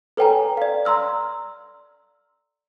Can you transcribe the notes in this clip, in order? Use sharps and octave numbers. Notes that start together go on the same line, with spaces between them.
A4 B4 C#5 G5 G#5 A#5
D5 F5
A#5 C6 E6 F6